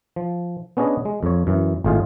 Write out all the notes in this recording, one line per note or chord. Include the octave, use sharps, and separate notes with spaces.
F3
B3 C#4 D4 G#4 D#5
G#3
F2 F3 C#5
F#2 E3
G#1 A2 F4 G#4 F5